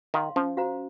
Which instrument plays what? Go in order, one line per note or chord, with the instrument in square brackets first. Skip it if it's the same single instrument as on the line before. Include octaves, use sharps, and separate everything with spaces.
[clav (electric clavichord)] D#3 [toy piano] F5 C6
[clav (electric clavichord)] F3 [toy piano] C#4
[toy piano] F#4 C5 F5 A#5